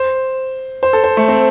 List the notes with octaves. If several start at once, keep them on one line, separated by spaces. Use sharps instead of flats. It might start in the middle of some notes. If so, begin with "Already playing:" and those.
Already playing: C5
C5
A4
C5
A3
C4